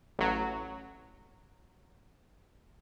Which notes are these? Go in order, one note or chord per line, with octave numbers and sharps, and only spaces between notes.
A1 F#3